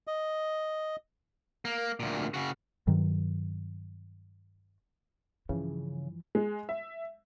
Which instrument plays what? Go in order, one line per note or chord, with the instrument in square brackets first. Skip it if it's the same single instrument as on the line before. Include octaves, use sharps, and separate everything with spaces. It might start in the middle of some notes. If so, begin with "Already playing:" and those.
[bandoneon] D#5
[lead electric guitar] A#3
D2 A#2
C#3 F#4
[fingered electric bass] G2 D#3 F#3
[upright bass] G2 [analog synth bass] C#3 [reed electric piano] E3 F3
[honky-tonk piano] G#3
E5